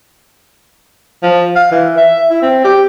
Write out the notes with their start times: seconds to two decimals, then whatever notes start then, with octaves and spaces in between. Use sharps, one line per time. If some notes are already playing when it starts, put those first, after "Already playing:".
1.23 F3
1.56 F5
1.72 E3
1.97 E5
2.30 E4
2.42 C4
2.64 G4